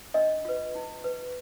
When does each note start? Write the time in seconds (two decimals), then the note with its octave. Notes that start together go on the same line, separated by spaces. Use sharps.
0.14 D4 D#5
0.45 F4 B4
0.75 D#4
1.04 B4